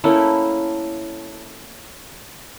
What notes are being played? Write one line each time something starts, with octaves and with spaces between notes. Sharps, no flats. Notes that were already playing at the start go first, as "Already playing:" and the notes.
A3 A#3 C#4 E4